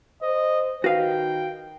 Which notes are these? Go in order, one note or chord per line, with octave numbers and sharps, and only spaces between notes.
C5 D#5
D#3 F#4 B4 F5 G5